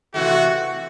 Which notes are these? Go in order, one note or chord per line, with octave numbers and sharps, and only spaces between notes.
C3 E3 A3 F#4